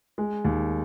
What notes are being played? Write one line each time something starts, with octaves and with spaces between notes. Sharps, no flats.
G#3
D#2